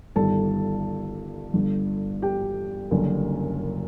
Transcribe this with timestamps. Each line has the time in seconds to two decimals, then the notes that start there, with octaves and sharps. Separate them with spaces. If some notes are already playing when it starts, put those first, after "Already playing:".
0.16 G1 G2 D#3 G3 A4 A5
1.54 G1 G2 D3
2.22 G4 G5
2.91 F#1 F#2 D3 G3